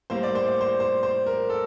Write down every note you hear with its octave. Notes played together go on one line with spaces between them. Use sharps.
A2 G3 A#3 C5
D5
C5
D5
C5
C5
C5
A#4
A4